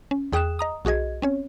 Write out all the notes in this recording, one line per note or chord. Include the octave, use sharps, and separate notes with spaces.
C#4
E2 G#4 G5 D#6 F#6 E7
D#5 A#5 D#6
B1 F#4 G#4 D#5 G#6
C4 C#4 C#5